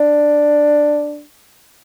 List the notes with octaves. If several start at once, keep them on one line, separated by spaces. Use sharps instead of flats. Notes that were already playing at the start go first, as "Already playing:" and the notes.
Already playing: D4